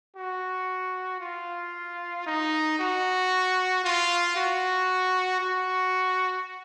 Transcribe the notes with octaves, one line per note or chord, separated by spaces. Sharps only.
F#4
F4
D#4
F#4
F4
F#4
F#4